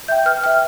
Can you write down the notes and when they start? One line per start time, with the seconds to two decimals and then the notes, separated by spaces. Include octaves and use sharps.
0.08 E5 G5 G6
0.26 B4 F6
0.43 E5 G5 F6